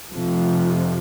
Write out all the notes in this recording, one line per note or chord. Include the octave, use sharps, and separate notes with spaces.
F1 F2 C3 F3